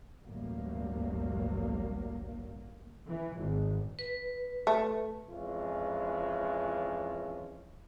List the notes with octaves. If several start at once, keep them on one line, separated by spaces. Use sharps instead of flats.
A1 D2 G2 F#3 G3 A#3
E3
G#1
B4
A3
F2 E3 G#3 C#4 F4